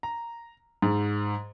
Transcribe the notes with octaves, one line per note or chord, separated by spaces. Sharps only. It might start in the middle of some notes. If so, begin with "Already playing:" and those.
A#5
G#2